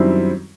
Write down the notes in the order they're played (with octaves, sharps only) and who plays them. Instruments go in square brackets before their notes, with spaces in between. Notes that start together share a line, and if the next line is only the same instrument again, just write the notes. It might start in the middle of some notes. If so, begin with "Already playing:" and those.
Already playing: [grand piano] F#2 D#3 G3 C4 E4